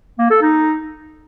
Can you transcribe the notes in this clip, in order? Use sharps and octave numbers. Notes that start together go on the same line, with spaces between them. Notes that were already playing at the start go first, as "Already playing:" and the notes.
A#3
A4
D#4